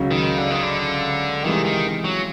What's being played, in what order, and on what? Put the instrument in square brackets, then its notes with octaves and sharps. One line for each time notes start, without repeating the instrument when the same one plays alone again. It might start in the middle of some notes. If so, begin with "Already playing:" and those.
Already playing: [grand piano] C#2 C#3 F#3
[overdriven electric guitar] D#3
D3
D#3
D3
[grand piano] C3 E3 G#3 C4 [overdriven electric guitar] D#3
[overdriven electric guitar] D#3
F#3